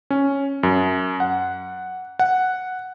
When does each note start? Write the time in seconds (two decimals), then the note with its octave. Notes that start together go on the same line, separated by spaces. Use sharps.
0.10 C#4
0.63 F#2
1.20 F#5
2.19 F#5